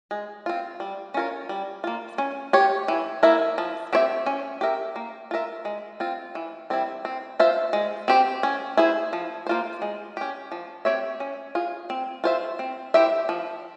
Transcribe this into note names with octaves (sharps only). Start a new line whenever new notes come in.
G#3
C4 F4
G3
C#4 F4 A#4 C#5
G3
A#3 F4
C#4
G4 C#5
E3
A#3 E4 A#4 E5
F3
C4 G4 C#5 E5
C#4
G4 A#4 E5
A#3
F4 A#4 E5
G#3
C4 F4
E3
G3 C4 E4
C4
F4 C5 E5
G#3
C4 G4 C5
C#4
E4 G#4 C5
F3
A#3 F4 C5
G#3
C#4 G4
F3
C4 G4 C#5 E5
C#4
F4 G#4
C4
F4 C5 E5
C4
E4 G4 C5 E5
F3